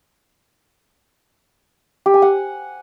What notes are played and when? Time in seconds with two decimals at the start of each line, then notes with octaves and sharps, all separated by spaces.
2.06 G4
2.14 G#5
2.22 F#5